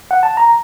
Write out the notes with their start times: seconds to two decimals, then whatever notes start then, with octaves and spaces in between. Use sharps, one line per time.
0.11 F#5
0.23 A5
0.37 A#5